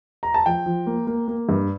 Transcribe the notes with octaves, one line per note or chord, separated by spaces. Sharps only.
A#5
A5
F3 G5
F3
A#3
A#3
A#3
G2